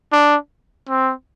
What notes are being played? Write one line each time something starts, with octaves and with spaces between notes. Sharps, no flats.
D4
C4